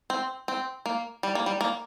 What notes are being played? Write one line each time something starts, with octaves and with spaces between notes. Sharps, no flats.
C4
C4
A#3
G3
A#3
G3
A#3